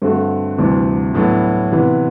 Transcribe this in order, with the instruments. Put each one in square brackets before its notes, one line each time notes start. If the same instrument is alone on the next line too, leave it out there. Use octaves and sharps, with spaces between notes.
[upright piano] G2 D3 A3 C4 F#4
D2 C3 E3 G3 D4
A2 F#3 B3 D4
C3 E3 B3